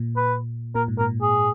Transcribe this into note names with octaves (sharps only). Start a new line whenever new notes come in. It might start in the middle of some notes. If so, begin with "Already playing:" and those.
Already playing: A#2
B4
A#2 A#4
G#2
A#4
A#2
G#4